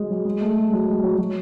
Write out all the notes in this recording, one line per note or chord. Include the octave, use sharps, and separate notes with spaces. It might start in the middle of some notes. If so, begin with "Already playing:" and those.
Already playing: F#3 G#3
F#3
G#3
A3
G#3
G#3
F#3
G#3
F#3
F#3